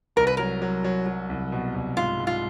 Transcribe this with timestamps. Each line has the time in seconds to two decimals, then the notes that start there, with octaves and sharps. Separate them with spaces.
0.16 C2 A#4
0.27 B4
0.37 F#3 A#4
0.62 F#3
0.84 F#3
1.06 F#3
1.29 C2
1.52 B2
1.74 C2
1.97 G#2 F4
2.20 G#2
2.27 F4